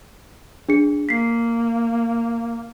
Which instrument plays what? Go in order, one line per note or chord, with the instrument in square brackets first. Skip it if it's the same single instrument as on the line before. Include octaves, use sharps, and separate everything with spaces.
[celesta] D4 G#4 C#7
[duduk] A#3 [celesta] B6 C7